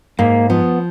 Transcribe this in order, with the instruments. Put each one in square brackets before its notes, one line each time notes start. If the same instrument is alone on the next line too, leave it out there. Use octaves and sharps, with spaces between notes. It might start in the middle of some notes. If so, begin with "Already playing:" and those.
[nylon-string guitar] G#2 [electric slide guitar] A#3
[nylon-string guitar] F3 [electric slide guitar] B3